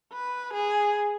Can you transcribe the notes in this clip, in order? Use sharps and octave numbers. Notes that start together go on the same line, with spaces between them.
B4
G#4